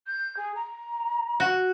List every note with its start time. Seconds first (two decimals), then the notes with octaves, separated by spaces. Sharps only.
0.07 G6
0.37 G#4
0.56 A#5
1.40 F#4